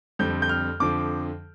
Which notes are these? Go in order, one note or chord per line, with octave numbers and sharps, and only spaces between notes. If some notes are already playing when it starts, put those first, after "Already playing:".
F2 D3 G3 C4 G6
G6
F6
F2 D3 F3 D6